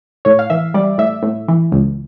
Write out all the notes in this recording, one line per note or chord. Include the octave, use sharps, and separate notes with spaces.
A2 C#5
F5
E3 E5
G3 D5
A2 E5
A2
E3
C#2